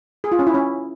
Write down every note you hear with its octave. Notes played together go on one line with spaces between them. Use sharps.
G#4
F4
C#4
E4
C#4